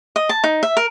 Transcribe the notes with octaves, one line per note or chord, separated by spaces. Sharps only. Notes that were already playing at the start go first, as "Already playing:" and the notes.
D#5
A5
D#4
E5
A#4